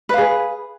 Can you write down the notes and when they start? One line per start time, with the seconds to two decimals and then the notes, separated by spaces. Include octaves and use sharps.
0.09 B4
0.14 F5
0.18 G#4